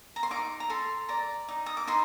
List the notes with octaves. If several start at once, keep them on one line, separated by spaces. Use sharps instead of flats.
A#5
C6
D#4 D6
A#5
A4 C6
D5 A#5
D#4
D#6
D6
D#4 C6